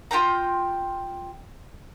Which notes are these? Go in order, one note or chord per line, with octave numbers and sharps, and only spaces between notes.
F4 G4 G5 A#5